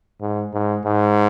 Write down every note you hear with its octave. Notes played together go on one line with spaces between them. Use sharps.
G#2
G#2
G#2